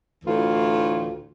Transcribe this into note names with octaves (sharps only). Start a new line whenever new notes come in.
D2 A2 E3 F4